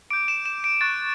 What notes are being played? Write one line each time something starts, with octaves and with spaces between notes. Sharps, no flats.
D6 G6 D7
E7
E7
D7
C#6 F#6 A6